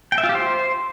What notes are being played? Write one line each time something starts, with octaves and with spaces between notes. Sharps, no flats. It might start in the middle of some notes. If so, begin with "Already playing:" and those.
G5
E5
F4
G4
C5